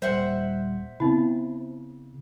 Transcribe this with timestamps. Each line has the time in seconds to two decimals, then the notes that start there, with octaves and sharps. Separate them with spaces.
0.02 D#1 G3 C5 E5 F#5
1.00 C#3 B3 C4 E4